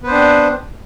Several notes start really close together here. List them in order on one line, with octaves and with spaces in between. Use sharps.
B3 B4 C5 D4 C4